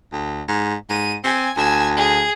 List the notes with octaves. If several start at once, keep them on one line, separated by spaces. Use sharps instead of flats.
D2
G#2
G#2 D#7
C4 G#5
D2 G#5 E6
G#4